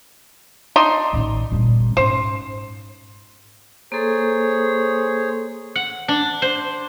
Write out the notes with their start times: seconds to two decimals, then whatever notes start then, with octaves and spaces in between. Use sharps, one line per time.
0.76 D4 D#4 C6
1.13 A1 D#3
1.52 G1 A#2
1.97 G#2 C#4 C5
3.92 A#3 G#4 A4 C5 C#5
5.75 F#5
6.08 D4
6.42 C5